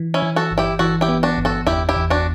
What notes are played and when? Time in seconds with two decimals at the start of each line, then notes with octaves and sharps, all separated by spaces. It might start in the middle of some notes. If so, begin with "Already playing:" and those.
Already playing: E3
0.14 C#4 E4
0.22 E3
0.36 F#4 A4
0.51 G1
0.58 E4 G4
0.79 E3 F#4 A4
1.01 E4 G4
1.08 B3
1.23 D4 F#4
1.38 G1
1.45 F#4 A4
1.67 E2 E4 G4
1.89 E4 G4
1.96 E2
2.10 D4 F#4